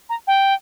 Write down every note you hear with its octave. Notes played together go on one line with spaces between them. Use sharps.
A#5
G5